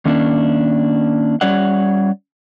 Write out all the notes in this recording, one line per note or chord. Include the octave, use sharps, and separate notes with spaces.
D#3 A#3 C#4 D4
G3 C#4 C#5 D5 F#5